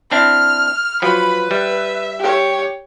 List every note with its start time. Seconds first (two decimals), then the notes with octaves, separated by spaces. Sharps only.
0.11 C4 D4 E4 F6
1.02 F3 F#3 B4 B5
1.51 G3 E5
2.19 G4 C#5